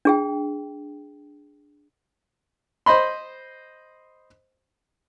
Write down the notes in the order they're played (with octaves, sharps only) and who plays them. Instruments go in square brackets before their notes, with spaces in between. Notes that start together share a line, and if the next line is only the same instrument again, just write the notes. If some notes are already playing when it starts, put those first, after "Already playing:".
[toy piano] D4 G#4 G5
[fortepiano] C5 D#5 B5 C6